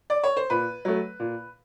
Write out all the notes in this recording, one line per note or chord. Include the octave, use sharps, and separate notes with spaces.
D5
C#5
C5
A#2 B4
F#3 A3
A#2